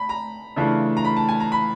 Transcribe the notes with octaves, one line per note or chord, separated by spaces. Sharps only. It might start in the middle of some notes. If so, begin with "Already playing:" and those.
Already playing: A5 B5
A#5
C#3 E3 A3 D4 F4
A#5
B5
A5
G#5
A#5
B5